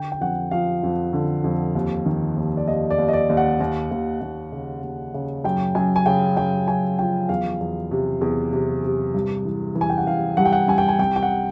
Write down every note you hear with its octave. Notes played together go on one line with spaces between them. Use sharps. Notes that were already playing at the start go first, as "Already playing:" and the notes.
Already playing: D3 G5
G5
F2 F#5
F3 F5
F2
D3
F2
D#2
D#3
D#2
D5
D#2 D#5
D5
D#2
D#5
D5
D#2
F#5
D#2
D#2
D#2
C#3
D#2
C#3
F#2 G5
F#2 G#5
G#5
C#3 G5
F#2 G5
F#2 G#5
F3 G5
E2 F5
E2
C3
E2
C3
C3
G2
E3
E3
G#5
G5
F#5
E3 F5
G2 F#5
G5
F#5
G2 G#5
G5
G#5
C2 G5
G5
F#5